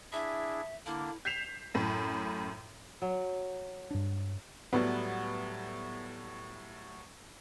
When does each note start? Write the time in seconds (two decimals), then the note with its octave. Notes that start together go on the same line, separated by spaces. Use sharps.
0.12 D4 E4 G#4 E5
0.86 D3 A#3 D4 E4
1.25 G6 B6 C7 E7 F7
1.74 F#2 A2
3.02 F#3
3.91 G2 D4
4.73 A2 F#3 G3 B3